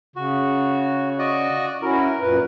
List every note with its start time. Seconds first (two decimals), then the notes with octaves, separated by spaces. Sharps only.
0.16 C#3 F#4
1.19 F#4 D5 D#5
1.82 C#4 E4 F#4 A#4
2.21 F#2 A#2 B4